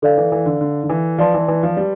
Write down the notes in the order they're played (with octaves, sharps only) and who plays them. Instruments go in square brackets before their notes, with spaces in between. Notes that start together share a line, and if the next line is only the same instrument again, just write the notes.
[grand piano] D3 [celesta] A4 D5 F5
[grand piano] E3
E3
D3
D3
D3
E3
[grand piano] F3 [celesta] B4 D5 A5 C6
[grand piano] E3
E3
F3
G3